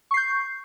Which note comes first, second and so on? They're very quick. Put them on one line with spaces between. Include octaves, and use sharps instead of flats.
C#6 C7 G6